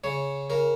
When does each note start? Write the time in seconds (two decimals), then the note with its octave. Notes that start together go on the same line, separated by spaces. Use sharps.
0.04 C#3 C#5
0.50 C#3 A#4